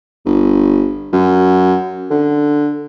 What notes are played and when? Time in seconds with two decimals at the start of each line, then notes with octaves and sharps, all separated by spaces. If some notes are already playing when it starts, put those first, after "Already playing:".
0.25 G1
1.12 F#2
2.11 D3